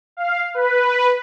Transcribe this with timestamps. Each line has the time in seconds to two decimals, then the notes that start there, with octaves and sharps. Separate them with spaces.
0.17 F5
0.54 B4